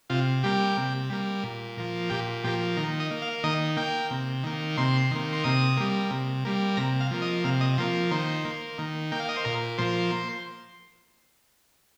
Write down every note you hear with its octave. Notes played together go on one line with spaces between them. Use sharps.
C3 F4
G3 A#3 G4
C3
G3 A#3
A#2
F3 A#3
A#2 G4
F3 A#3 G4
D#3 A#4
D#5
A#3
F5
D#3 D#5
A#3 G5
C3
D#3 A#3
C3 C6
D#3 A#3
C6
C3 D#6
G3 A#3
C3
G3 A#3
C3 A#5
F5
F3 A#3
D#5
C3 F5
D#5
F3 A#3 C5
D#3 C5
A#3
D#3
A#3 G5
F5
D#5
C5
A#2 A#4
F3 A#3 C5